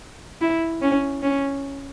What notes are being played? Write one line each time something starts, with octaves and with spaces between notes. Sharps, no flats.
E4
C#4
C#4